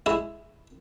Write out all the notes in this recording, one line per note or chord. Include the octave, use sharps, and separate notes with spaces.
G#3 E4